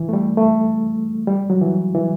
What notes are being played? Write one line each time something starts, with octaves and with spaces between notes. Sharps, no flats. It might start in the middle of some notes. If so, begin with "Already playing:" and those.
Already playing: E3
A3
G3
A3
G3
F#3
E3
E3